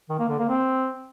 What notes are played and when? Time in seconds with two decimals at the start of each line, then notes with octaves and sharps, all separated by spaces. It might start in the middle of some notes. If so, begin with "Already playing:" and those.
0.09 D#3
0.19 A#3
0.29 D3
0.39 A#3
0.48 C4